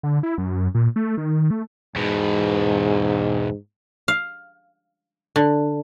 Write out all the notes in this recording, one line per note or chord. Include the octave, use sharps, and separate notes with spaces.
D3
E4
F#2
A#2
A3
D#3
A3
E2 G#2 B2
F5
D3